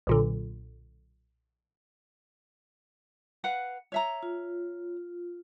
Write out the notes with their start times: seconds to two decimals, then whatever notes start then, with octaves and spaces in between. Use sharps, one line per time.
0.07 B1 A#2 D3
3.44 B4 F5 F#5
3.92 C#5 E5 A#5
4.23 F4